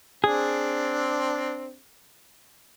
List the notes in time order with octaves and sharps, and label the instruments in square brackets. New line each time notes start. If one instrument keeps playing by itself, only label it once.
[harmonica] C4 D4 [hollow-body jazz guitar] G#4